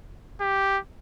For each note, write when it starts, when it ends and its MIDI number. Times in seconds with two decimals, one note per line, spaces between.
0.41 0.79 67